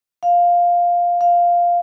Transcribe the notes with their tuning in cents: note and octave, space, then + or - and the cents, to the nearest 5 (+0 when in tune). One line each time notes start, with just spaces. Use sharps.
F5 +5
F5 +0